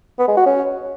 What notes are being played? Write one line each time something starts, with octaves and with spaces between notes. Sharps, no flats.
B3
G#3
F#4
C#4